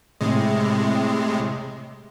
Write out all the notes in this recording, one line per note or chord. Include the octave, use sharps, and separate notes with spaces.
A2 C3 G#3